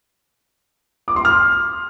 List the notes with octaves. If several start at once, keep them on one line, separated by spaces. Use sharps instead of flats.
D6
C6
F6